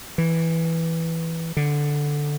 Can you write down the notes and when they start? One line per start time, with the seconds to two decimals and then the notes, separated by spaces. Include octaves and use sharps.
0.18 E3
1.57 D3